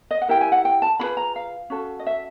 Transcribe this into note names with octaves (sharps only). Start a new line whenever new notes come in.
D#5
F#5
E4 G4 A#4 G5
G#5
F#5
G5
A5
C#4 F4 G#4 B4 B5
A#5
F5
C#4 F#4 A4
D#5
E5